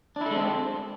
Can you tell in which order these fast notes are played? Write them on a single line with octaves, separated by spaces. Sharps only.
D4 E4 A4 G#3 C4